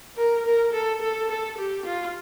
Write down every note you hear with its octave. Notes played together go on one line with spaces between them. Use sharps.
A#4
A#4
A4
A4
A4
G4
F4